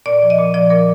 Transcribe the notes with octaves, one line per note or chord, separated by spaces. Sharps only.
A#2 D5
F3
D#5
A#2
F3 D5
A#2 A#4